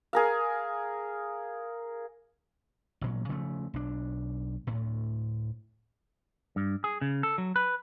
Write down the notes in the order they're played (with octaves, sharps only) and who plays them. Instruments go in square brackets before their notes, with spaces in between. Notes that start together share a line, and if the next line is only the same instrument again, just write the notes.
[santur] G#4 A#4 F5
[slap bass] A1 A#2 F#3
C#3 F3 A3
B1 D4
D2 A2
[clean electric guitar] G2
G#4
C#3
A4
F#3
B4